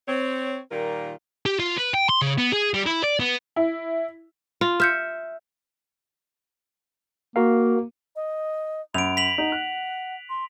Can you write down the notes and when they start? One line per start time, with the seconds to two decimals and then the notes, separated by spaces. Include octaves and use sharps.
0.08 C4 C#5
0.71 A#2 D#3 G3 A#3 F4 A#4
1.46 G4
1.59 F4
1.77 B4
1.94 G5
2.09 C6
2.22 C#3
2.38 B3
2.53 G#4
2.74 G3
2.86 E4
3.03 D5
3.20 B3
3.56 E4
4.61 F4
4.80 E5 F6 G6 C#7
7.36 A#3 F#4 A#4 F5
8.16 D#5
8.94 F#2 B5 D7 F7
9.17 B6 F7 F#7
9.38 D#4 F#5
9.52 F#6
10.29 C6